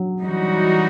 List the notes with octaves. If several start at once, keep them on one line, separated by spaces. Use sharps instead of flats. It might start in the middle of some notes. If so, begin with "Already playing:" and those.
Already playing: F#3
E3 G3 D#4 F#4